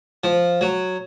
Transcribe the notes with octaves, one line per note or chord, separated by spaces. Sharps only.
F3
F#3